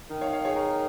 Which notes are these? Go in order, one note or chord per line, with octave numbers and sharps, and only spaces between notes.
D#3
C#5 F5
C#5 F5
G#4 C#5
A#4